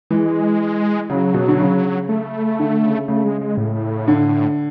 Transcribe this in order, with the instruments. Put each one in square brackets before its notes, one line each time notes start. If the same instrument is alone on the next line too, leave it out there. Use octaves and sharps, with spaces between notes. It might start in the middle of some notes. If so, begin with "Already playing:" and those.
[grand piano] E3 [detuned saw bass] G#3
[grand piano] C#3 [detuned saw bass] F#3
[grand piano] B2
D3
C#3
[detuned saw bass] A3
[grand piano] D3
C#3
[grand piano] C#3 [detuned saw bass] A3
[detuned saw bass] G#3
G#3
A2
[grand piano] D3